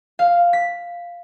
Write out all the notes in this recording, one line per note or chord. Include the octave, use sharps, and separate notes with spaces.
F5
B6